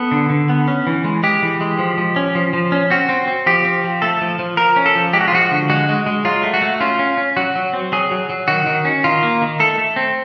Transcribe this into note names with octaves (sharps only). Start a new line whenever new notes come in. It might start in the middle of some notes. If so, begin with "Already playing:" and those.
Already playing: B3 A4
D3
D3
B3
C#4
E3
G#3
G#3 G4
E3
G#3
F3
F3
C#4
F3
F3
C#4
C4 F#4
C4
C4
F3 G4
C4
F3
A3 A4
F3
F3
F3 A#4
C#4
A4
F3
G#3 G4
F#4
F4
F3 F#4
D3
G#3 F#4
G#3
G#3
F#3 F4
A3
F#4
A3
C#4 F4
C#4
C#4
F#3 F#4
F#3
C4
F#3 G#4
F#3
F#3
D#3 F#4
D#3
C#4
D#3 F4
A#3
D#3
A3 A4
A3
C4